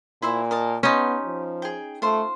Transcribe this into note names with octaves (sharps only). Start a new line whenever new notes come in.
A#2 E4 C5 E5
A#4 D#5 A5
B3 C#4 D#4 G4 D#5 C6
F3
G#4 G5
A3 F4 C5